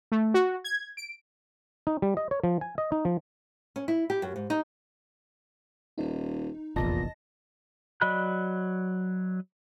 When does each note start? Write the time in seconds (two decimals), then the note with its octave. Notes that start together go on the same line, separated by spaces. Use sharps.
0.12 A3
0.34 F#4
0.64 G#6
0.97 D7
1.87 D#4
2.02 G3
2.17 D#5
2.31 C#5
2.44 F3
2.61 G#5
2.78 D#5
2.92 D#4
3.05 F3
3.76 C#4
3.88 E4
4.10 G4
4.22 F#2
4.36 G#2
4.50 D#4
5.98 D#1 D#4
6.76 F1 A#1 E2 A#2 D#5 A5 A#6
8.01 F#3 D5 D#5 B5 F#6